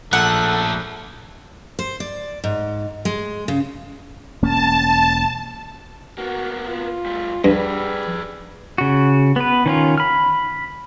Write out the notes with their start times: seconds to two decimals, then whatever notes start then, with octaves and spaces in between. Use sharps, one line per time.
0.13 A#1 A3 C#4 A4 F#5
1.79 C5
2.00 D5
2.44 G#2
3.05 G#3
3.48 C#3
4.42 E1 A#3 C#4 A5
6.18 A#3 B3 F#4
6.68 F4
7.06 G3 A3
7.44 G2 G3 G#4 B4
8.78 C#3 F#4
9.36 B3 B4
9.66 D#3 C#4 F4
9.98 B5 F6